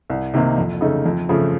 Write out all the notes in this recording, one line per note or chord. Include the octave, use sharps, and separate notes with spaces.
C2
C3 D#3 A#3 D#4
F2
C#3 A3 D#4
F2
C#3 F3 A3